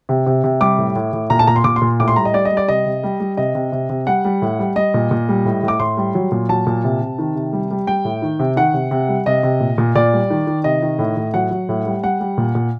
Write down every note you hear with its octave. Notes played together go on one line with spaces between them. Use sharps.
C3
C3
C3
G3 D6
A2
A2
A2
A#2 A#5
A5
A#2 A#5
C6
A#2 D6
C6
A#2
A2 D6
C6
G3 A#5
D#5
G3 D5
D#5
G3
D5
C3 D#5
C3
G3
G3
C3 D#5
C3
C3
C3
G3 F#5
G3
A2
G3
G3 D#5
A#2
A#2
G3
A2
A2
D6
A2 C6
G3
F#3
A#2
F#3 A5
A#2
C3
C3
D#3
C3
G3
G3
G3 G5
A2
D#3
C3
D#3 F#5
C3
C3
G3
C3 D#5
C3
A#2
A#2
A#2 D5
G3
D#3
D#3
C3 D#5
D#3
A2
A2
F#3 F#5
F#3
A2
G3
G3 F#5
G3
A#2
A#2